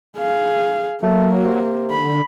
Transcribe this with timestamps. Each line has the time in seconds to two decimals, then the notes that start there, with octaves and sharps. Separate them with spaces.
0.18 G#4 F5
1.03 F#3 A3 A#3
1.45 C3
1.90 D3 B5